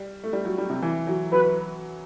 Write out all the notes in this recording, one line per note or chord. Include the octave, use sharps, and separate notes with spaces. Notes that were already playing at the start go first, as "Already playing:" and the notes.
Already playing: G3
A3
G3
F#3
G3
C3
E3
F#3
F#3 B4